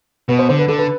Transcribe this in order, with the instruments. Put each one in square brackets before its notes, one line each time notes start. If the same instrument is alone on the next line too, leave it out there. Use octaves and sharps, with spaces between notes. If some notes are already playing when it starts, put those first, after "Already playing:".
[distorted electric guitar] B2 [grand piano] B4
[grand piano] C5
[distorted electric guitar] D3 [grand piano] C5
[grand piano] B4
[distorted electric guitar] D3 [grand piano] A4
[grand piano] B4